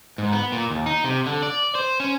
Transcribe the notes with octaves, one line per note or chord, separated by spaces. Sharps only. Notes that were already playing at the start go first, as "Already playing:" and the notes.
G#2
B3
A#2
D#2
D#4
C3
D3
D5
C5
C#4